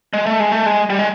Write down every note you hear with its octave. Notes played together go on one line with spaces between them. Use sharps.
G#3
A3
G#3
A3
G#3
G3
G#3